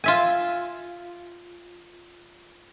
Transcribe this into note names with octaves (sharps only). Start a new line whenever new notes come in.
F4 E5 G#5